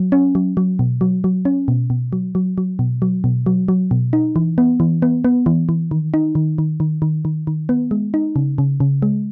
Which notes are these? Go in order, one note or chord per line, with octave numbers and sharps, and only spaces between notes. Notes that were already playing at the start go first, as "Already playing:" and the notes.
Already playing: F#3
C#4
F#3
F#3
B2
F#3
F#3
C#4
B2
B2
F#3
F#3
F#3
B2
F#3
B2
F#3
F#3
B2
D#4
E3
B3
E3
B3
B3
E3
E3
D#3
D#4
D#3
D#3
D#3
D#3
D#3
D#3
B3
G#3
D#4
C#3
C#3
C#3
G#3